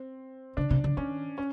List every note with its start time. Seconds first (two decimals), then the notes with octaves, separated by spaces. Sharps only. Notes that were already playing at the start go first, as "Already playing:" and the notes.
Already playing: C4
0.57 C#3 D4
0.70 C3
0.84 D3
0.97 D#3 C#4
1.38 C#4